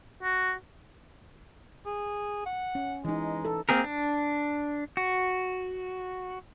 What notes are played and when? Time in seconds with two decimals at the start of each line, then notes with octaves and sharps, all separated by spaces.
0.23 F#4
1.86 G#4
2.46 F#5
2.75 C#4
3.05 E3 G#3 D#4
3.45 A4
3.69 A#3 C4 G#4 A#4
3.84 D4
4.97 F#4